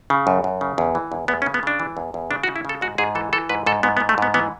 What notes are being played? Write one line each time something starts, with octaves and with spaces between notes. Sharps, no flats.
C#3
F#2
F#2
C#3
E2
E3
E2
E2 B3
C#4
C#3
B3
C#3 D4
E3
E2
E2
C#3 D4
F#4
C#3
E4
C#3 A4
G#2 F#4
G#2 G#4
E3 A4
E3 A4
G#2 B4
G#2 A4
G#2 B3
B3
G#2
A3
G#2 B3
E3 B3